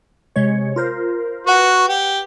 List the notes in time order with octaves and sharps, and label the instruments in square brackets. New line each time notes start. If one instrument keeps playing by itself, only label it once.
[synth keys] C3 G#3 C#5
F4 A#4 C5
[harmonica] F#4 [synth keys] B4 F#5
[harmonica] G4